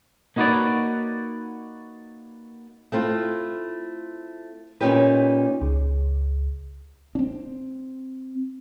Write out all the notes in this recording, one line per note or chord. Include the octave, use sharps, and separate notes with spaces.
A#3 D#4 F#4 B4 C#5 D5
A3 C4 E4 F4
A#2 A#3 C#4 D#4 G4 B4
C#2
C4 D4